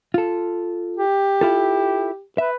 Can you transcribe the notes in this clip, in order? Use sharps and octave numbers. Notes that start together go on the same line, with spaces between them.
F4 A4
G4
E4 F4 A4
B4 E5